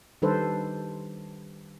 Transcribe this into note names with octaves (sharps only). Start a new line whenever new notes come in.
D#3 G3 D4 A4 B4 C5